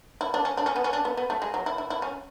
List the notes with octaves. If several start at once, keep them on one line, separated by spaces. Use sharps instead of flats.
E4
D4
C#4
D4
C#4
B3
C#4
D4
B3
B3
A3
G#3
F#3
E4
E4
E4
C#4